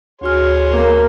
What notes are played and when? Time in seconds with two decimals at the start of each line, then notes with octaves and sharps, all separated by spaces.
0.21 D2 F#4 G#4 C#5 C6 F6
0.71 A#3